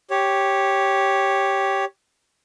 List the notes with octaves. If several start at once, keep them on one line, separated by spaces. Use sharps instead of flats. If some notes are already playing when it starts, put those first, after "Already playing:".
G4 C#5